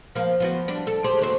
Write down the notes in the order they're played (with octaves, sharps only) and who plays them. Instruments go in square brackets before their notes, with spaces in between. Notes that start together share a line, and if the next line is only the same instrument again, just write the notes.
[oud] F3 A#3
F3 B3 F#4
G3 D4
A4
G4 G#4 C5
D#2 F#3 C5